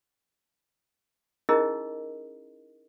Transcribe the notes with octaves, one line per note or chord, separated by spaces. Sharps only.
C#4 D#4 E4 G#4 A#4 D#5